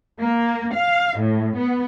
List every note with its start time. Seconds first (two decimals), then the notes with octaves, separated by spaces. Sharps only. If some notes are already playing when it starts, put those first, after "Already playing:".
0.20 A#3
0.74 F5
1.18 A2
1.56 B3